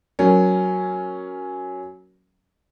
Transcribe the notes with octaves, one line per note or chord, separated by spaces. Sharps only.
F#3 A#3 C#4